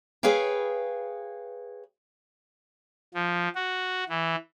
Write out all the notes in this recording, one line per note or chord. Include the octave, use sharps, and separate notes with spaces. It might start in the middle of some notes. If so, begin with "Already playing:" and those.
G#4 B4 C#5 F5 G5
F3
F#4
E3